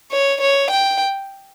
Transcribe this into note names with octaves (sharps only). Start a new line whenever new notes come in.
C#5
C#5
G5